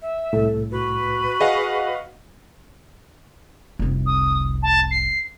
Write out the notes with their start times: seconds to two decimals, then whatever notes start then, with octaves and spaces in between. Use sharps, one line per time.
0.02 E5
0.33 C2 A2 A4
0.71 F#4 B4
1.41 G#4 D#5 F5 F#5
3.79 F1 C2
4.06 D#6
4.63 A5
4.91 C7